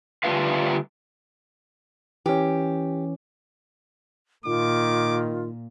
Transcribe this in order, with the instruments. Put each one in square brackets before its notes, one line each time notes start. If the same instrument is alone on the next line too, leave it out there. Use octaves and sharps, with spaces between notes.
[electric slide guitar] D3 G3 A3 F4 B4 F5
[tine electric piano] E3 C#4 [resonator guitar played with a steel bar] G4
[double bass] A#2 [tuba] D#3 [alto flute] F4 [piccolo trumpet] D6